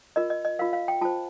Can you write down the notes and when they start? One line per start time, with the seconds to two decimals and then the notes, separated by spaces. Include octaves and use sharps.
0.16 F4 A#4 D#5
0.30 D#5
0.45 D#5
0.59 F4 A#4 F5
0.73 F5
0.88 G5
1.01 F4 C5 A5